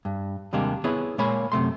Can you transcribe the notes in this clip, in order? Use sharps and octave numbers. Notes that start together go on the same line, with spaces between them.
G2
D#2 C3 G3 G#3 A#3 D4
B3 E4 G#4 B4 C#5
A#2 G#3 A#3 C#5 B5
F#2 C3 A3 C6